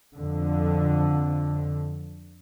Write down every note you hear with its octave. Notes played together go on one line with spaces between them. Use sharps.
F2 D3